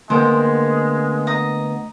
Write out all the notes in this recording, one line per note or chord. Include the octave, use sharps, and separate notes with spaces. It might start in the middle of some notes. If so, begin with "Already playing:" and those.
D2 G#3 A#3 B3 C5 G5
D#5 A#5